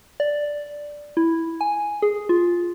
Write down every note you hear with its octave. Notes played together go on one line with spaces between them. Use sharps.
D5
E4
G#5
G#4
F4